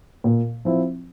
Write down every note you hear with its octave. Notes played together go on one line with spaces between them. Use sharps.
A#2
F3 C4 E4